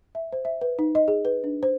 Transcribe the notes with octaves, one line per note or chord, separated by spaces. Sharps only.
E5
C5
E5
B4
D#4
D#5
G#4
B4
D4
C5